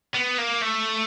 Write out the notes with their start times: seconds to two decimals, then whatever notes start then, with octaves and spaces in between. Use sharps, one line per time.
0.15 B3
0.38 A#3
0.62 A3